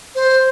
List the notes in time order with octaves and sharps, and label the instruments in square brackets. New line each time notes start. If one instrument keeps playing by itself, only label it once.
[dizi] C5